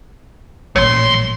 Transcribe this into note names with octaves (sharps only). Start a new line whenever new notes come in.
A1 A#2 F#3 C#5 C6